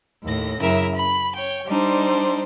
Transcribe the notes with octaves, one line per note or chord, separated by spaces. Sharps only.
D#2 A2 A#6
F#2 C#3 E4 A#4 E5
B5
C#5 G5
G3 D4 D#4 C5